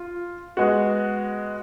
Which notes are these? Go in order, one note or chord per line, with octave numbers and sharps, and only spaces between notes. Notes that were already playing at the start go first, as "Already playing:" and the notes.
Already playing: F4
G#3 B3 F#4